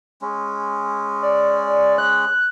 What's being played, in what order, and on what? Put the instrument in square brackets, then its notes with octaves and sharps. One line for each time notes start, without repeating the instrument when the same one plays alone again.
[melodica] G#3 C#4
[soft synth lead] D5
F#6